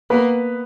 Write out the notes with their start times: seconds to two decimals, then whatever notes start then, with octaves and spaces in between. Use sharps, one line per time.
0.10 A#3 B3 B4